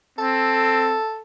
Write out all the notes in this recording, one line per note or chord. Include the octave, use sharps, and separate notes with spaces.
C4 A4